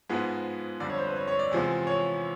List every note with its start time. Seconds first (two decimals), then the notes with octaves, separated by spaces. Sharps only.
0.09 G#2 F3 G#3 B3
0.80 F2 D3 G3 D5
0.90 C#5
0.98 C5
1.07 B4
1.16 C#5
1.28 C#5
1.39 D5
1.51 E2 C3 F3 G#3
1.87 C#5